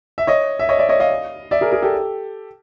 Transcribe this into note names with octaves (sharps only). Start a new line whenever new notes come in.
E5
C#5 D#5
E5
C#5 D#5
D5 E5
C#5 D#5
D#5 F5
D5 E5
G#4 A#4
G#4 A#4
G4 A4